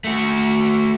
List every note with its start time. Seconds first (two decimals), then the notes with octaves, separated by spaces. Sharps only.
0.04 A3 F#4